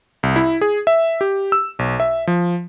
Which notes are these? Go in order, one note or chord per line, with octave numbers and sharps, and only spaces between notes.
C2
E4
G#4
E5
G4
E6
B1
E5
F3